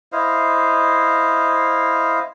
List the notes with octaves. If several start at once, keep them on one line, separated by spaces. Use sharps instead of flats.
E4 C5 D#5 F5